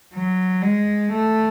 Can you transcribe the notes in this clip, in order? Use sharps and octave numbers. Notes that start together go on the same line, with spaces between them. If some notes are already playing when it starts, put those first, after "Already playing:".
F#3
G#3
A3